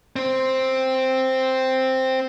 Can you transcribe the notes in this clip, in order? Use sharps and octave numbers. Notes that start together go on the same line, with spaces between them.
C4 C5